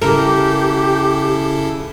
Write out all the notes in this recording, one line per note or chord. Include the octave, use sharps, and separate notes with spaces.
C#3 E4 G4 A4 A#4